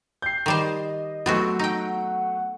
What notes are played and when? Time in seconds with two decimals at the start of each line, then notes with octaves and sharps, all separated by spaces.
0.22 G5 G6 C7
0.46 D#3 G3 C5 D#5
1.26 F#3 A3 B3 C4 F#4
1.59 D#4 F#5 G5